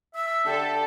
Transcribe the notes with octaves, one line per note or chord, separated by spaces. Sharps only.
E5 E6
D3 G4 A4